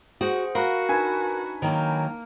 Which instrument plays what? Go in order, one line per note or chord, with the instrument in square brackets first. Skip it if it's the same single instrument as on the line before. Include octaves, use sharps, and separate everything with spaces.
[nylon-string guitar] F#4 [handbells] G#4 C5 F#5
[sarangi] F#4 [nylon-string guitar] A#4 [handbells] F5 F#5 B5
[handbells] D4 D#4 [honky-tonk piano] B4 G#5
[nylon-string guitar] D#3 F#3 [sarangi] A#3